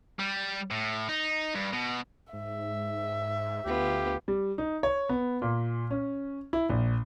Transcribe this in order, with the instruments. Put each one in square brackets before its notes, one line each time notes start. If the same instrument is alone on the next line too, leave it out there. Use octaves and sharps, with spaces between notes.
[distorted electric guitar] G3
A2
D#4
G2
B2
[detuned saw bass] G#2 [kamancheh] E5
[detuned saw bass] D2 [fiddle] B3 F4 [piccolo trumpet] G4
[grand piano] G3
D#4
C#5
B3
A#2
C#4
E4
A#1